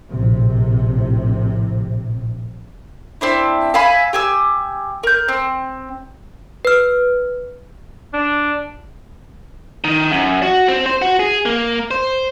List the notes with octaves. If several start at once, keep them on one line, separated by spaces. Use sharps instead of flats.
A#1 A2 C3
C4 D4 E4
E5 F5 G#5 B5
G4 G#5 E6
A#4 G6
C4
B4 F6
D4
D#3
F#2
F#4
C4
C5
F#4
G#4
A#3
C5